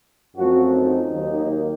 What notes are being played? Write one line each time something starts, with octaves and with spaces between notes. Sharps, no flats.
F#2 F3 A3 C4 F#4
D#4
D#2 D#3 F#3 A#3